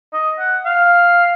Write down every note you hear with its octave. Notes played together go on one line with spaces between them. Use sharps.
D#5
F#5
F5